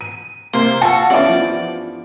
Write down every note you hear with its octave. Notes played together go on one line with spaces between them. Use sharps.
D#7
C3 A#3 C5
F4 F#4 A5 C#6 E6
G2 E3 B3 C#4 D5 D6
F3